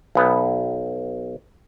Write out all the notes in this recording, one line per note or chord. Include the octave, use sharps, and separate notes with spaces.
B1 B3